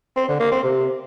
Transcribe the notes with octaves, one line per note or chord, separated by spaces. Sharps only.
C4
D3
A#3
C4
C3